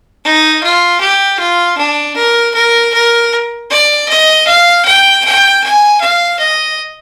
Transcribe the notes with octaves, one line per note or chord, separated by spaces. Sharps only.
D#4
F4
G4
F4
D4
A#4
A#4
A#4
D5
D#5
F5
G5
G5
G#5
F5
D#5